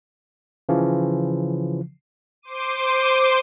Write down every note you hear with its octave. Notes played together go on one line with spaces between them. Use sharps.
C#3 E3 F3
C5 C6 D6 D#7